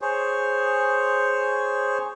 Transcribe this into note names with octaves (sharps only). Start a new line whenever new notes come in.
G#4 C5 C#5